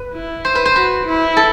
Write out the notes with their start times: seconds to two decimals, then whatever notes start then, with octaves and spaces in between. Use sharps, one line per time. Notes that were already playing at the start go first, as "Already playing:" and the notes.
Already playing: B4
0.14 E4
0.45 C5
0.55 B4
0.66 C5
0.76 F#4 B4
1.06 E4
1.37 A4